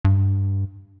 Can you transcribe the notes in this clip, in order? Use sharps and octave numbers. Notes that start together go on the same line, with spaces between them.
G2